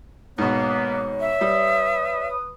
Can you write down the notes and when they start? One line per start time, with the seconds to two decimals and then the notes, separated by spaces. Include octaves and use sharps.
0.38 G#2 B2 A#3 B3 C#5
1.20 E5
1.41 G3 B4 D#6